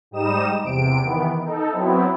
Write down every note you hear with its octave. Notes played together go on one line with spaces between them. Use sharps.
G#2 G3 D#4 D#6 E7
E2 C3 D7
D#3 E3 B3
D#4 A4
F#3 B3 C4 E4